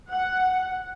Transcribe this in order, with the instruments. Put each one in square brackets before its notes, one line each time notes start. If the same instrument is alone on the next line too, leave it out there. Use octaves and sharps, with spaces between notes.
[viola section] F#5